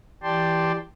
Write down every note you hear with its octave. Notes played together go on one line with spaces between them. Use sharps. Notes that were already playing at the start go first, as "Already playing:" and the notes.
E3 G4 D5 G5 A5 C6